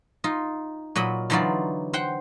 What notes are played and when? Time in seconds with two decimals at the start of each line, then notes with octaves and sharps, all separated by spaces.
0.24 D#4 F4
0.96 A#2 F#3 D#5 B5
1.30 D3 E3 F#3 D#4 F4 D5
1.93 C5 F#5 G5